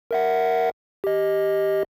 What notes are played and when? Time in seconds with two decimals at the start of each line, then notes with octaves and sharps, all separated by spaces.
0.11 A#4 E5 F#5
1.04 G4 D#5